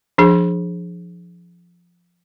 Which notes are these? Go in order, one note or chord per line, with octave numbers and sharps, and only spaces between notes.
F3 D4 G#4